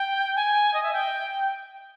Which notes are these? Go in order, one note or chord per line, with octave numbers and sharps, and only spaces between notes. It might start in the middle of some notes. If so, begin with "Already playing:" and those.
Already playing: G5
G#5
D#5
E5
G5